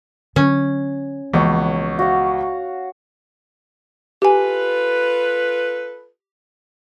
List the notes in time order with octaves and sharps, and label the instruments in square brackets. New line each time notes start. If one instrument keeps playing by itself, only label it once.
[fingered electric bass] D3 F#3 [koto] C#4
[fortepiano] C#2 B2 [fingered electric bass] E3 F3 A#3 [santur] C#5 F#5 D6
[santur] F#4 F5
[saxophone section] F4 A4 B4 [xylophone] G4 G#5